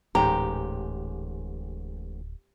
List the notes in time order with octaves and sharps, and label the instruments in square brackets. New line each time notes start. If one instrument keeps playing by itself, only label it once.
[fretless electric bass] D1 [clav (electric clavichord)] A1 G#2 [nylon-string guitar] G4 [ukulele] A#5